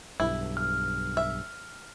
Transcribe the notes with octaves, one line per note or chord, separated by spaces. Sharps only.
B1 G2 E4
F6
E5